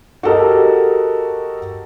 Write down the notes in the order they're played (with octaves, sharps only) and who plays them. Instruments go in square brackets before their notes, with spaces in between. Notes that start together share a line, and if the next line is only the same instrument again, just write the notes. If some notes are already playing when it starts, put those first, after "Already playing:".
[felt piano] F#4 G4 A4 A#4 D#5